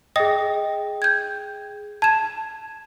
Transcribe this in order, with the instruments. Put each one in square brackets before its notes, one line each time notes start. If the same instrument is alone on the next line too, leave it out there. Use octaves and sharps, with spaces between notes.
[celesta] G#4 G5 [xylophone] D#5 D#6 A#6
[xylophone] G6 G#6
[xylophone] A5 E7 [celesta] G#6